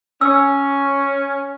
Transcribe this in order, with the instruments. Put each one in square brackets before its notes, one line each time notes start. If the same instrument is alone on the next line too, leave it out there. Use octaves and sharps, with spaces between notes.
[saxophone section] C#4 [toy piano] E6